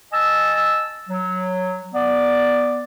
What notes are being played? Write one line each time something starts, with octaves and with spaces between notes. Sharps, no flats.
D#5 G#5 A5 E6
F#3
B3 D5